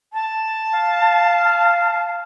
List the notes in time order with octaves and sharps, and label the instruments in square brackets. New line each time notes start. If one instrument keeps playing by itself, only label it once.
[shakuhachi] A5
[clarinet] F5